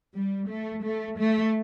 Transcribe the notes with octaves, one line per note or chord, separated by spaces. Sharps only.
G3
A3
A3
A3